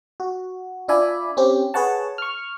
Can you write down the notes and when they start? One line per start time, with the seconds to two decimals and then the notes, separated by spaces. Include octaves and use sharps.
0.20 F#4
0.88 D4 F4 D5 E5 G#5 B5
1.37 C4 C#4 G4
1.74 G#4 B4 C#5 F#5 A5
2.18 C#6 F6